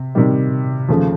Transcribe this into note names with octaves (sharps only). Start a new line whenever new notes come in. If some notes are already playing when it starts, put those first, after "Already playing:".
Already playing: C3
C3 D#3 G3
D#2 C#3 F3 A3